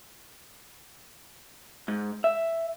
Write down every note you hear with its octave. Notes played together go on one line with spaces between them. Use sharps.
G#2
E5